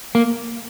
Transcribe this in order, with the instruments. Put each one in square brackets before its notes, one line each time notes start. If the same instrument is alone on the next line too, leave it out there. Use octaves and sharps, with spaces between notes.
[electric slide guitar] A#3